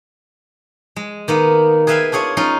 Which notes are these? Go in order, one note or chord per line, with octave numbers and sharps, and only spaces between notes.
G#3
D#3 A#3 B3
G#4 B4 E5 F5 G5 G#5
D4 F4 G#4 C#5 G#5
C#4 D#4 F4